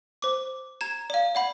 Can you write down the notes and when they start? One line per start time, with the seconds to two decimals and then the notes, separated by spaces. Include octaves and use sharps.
0.22 C5 D6
0.81 A#5 G#6 E7
1.10 D5 F5
1.35 D5 F#5 B5